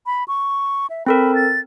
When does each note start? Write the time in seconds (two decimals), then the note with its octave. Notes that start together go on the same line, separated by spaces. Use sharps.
0.06 B5
0.28 C#6
0.90 E5
1.06 C4 A4 A#4 B5
1.35 A6